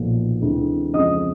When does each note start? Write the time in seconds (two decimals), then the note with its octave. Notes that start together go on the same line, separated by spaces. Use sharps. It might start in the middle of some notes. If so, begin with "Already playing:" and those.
Already playing: B1 A#2 F3
0.41 D2 C3 E3 G#3
0.93 F2 C#3 F3 G#3 D#5 D#6